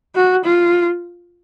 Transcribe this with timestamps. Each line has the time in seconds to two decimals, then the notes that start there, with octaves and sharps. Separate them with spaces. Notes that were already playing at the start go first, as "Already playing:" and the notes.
0.15 F#4
0.45 F4